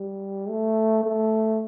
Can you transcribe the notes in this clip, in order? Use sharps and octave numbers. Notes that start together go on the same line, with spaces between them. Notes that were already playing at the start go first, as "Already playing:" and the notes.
Already playing: G3
A3
A3